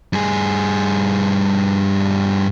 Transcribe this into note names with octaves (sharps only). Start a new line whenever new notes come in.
G2 G#4